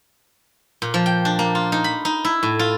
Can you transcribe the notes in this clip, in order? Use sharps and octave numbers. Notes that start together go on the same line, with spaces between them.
A#2
F3
G5
D4
A#3
F4
D#4
B5
D#4
E4
A2
F4